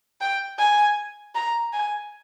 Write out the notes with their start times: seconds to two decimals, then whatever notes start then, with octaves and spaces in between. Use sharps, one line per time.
0.21 G5
0.59 G#5
1.35 A#5
1.73 G#5